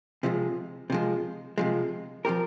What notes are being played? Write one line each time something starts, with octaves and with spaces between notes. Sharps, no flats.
C3 F3 G#3
C3 F3 G#3
C3 F3 G#3
F3 C4 G4 A#4